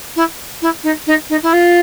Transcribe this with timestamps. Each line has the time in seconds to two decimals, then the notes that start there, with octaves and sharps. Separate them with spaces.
0.16 E4
0.61 E4
0.83 D#4
1.06 D#4
1.29 D#4
1.42 E4
1.53 F4